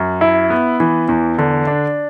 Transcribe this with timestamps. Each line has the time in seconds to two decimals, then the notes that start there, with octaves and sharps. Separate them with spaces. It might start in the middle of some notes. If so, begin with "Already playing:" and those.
Already playing: F#2
0.21 E4
0.50 B3
0.80 E3
1.08 E2
1.38 D3
1.67 D4